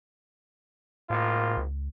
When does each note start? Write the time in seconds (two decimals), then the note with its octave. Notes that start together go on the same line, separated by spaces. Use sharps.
1.10 G#1 A2 A#3 F4
1.57 C#2